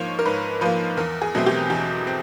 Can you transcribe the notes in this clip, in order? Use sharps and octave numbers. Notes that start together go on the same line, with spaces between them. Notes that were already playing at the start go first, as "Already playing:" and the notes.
Already playing: G#2 F3 A#3 C5 C#5
A#4
G#2 B4
F3 A#3 B4
E2 A#4
G#4
B2 F#3 A3 C4
G4
E2 G4
C4